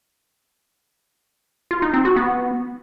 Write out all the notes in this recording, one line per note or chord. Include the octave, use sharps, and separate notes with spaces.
F4
D#4
C4
F#4
B3